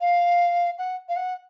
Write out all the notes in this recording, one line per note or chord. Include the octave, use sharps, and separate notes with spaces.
F5
F#5
F5
F#5